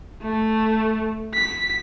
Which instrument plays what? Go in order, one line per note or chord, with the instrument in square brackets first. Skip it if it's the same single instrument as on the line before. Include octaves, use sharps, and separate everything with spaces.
[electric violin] A3
B6